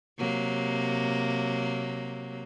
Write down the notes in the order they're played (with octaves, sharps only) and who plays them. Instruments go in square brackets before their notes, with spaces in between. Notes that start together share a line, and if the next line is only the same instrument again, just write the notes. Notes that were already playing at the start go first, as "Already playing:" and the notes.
[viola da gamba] C3 F#3 A#3